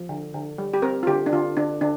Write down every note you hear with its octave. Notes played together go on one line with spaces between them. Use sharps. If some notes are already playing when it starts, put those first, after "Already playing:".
Already playing: F3
D3
D3
G3
G4
C4 A#4
F4
D3 G4
D4
D3 F4
D3 D4
D3 D4